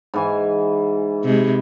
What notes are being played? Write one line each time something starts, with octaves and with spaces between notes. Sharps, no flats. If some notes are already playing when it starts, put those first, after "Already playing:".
G#2 E3 G#5
C3 G#3